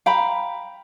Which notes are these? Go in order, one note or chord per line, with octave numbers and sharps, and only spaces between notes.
F5 G5 A#5 B5